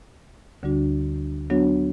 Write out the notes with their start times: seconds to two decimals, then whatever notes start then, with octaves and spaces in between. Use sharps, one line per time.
0.63 D2 D3 G3 D4 F#4
1.50 F#3 B3 D4 F#4 C#5